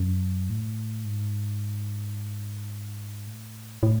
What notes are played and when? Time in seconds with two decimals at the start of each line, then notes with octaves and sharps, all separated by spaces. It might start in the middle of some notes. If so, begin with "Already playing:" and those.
Already playing: F#2
0.50 A2
1.05 G#2
3.27 A2
3.83 A2